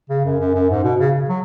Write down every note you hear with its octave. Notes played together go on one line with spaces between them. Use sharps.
C#3
F#2
F#2
F#2
G#2
B2
C#3
F#3